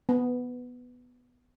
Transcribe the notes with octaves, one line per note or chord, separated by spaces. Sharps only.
B3